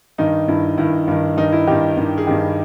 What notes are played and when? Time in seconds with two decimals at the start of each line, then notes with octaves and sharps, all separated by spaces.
0.18 G2 D#3 D#4
0.48 G2 D#3 E4
0.78 G2 D#3 E4
1.08 G2 D#3
1.37 G2 D#3 D#4
1.53 E4
1.67 G2 D#3 G4
1.97 G2 D#3
2.18 G#4
2.27 G2 D#3 G4